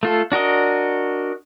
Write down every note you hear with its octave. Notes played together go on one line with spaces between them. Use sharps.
A3 F4 A4
D4 F#4 A#4 D#5